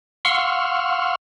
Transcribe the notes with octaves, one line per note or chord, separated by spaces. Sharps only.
F5 F#5 C6 C#6 E6 F6